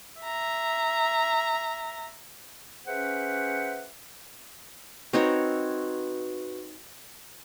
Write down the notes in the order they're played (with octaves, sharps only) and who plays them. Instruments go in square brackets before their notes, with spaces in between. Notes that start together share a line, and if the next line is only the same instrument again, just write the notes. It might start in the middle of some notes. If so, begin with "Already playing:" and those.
[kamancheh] E5 A#5
[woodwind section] C#4 G#4 B4 C5 E5 F#5
[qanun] C4 D#4 C#5 [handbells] F#4 B4